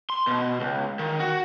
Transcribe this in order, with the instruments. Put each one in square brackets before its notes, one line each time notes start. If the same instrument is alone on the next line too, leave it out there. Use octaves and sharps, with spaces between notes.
[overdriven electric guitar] C6
B2
C#2
D#3
F#4